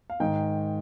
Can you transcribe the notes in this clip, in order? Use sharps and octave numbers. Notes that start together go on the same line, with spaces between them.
F5
G#2 D#3 G5